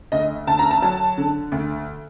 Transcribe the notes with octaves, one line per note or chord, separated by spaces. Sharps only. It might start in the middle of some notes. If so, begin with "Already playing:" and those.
D2 D#5
D2 A5
A#5
A5
F#3 A5
D3
D2